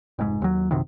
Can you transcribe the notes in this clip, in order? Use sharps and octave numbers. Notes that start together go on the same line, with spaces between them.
F1 G#2
D#2 F#3
A#1 F#2 C3 D#3